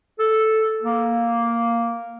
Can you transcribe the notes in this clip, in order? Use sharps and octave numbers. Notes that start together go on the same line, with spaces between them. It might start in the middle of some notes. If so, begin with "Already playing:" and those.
A4
A#3